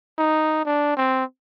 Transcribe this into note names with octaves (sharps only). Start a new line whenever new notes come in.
D#4
D4
C4